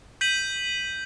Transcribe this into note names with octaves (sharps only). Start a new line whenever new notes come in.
G6 B6 D#7 F#7